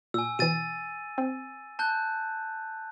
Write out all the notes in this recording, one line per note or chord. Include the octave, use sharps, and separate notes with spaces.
A#2 G#5 E6
B2 E3 A6 D#7
C4
A5 F#6 G6